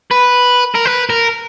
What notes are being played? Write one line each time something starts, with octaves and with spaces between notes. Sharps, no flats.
B4
A#4
B4
A#4